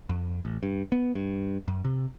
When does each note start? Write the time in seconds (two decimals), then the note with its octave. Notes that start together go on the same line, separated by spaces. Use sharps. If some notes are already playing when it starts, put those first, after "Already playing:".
0.09 F2
0.45 A1
0.63 G2
0.92 B3
1.15 G2
1.68 F#2
1.85 C3